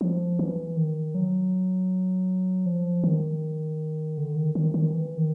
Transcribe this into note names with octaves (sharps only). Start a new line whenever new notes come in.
F3
E3
D#3
F#3
F3
D#3
D3
D#3
D#3
D#3
E3
D#3